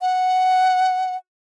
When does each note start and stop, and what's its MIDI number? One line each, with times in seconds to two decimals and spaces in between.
0.01 1.16 78